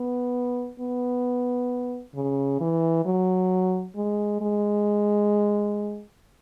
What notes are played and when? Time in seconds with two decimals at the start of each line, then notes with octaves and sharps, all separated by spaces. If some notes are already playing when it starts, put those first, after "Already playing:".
Already playing: B3
0.80 B3
2.15 C#3
2.61 E3
3.05 F#3
3.96 G#3
4.41 G#3